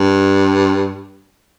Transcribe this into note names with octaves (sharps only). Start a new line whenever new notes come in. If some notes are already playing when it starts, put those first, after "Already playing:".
Already playing: G2